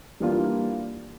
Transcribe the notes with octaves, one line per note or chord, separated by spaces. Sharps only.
E3 G3 A#3 D4 F4